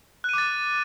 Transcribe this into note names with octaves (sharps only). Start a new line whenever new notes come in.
D6 F#6 A6 D#7